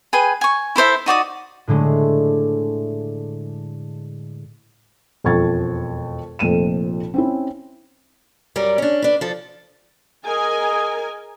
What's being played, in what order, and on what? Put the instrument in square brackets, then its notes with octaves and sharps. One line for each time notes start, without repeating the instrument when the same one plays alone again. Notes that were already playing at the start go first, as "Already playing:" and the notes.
[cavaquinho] G#4 B4 G5 G#5
G#5 C#6
E4 A4 C5 E5
D#4 F#4 D5 D#6
[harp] A2 D3 G#3 A3
[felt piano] E1 F2 F3 C#6 G#6 A6
F1 F2 A#2 A3 D#7 E7
C4 C#4 E4
[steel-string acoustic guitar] F#2 G3 A#4 D5
C#4 D4
D4 B4
F3 A4
[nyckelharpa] G#4 D#5 [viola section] A#4 G#5